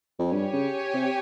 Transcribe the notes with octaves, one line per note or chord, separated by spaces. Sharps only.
F2
G2 G4 C#5 G#5
C#3
C3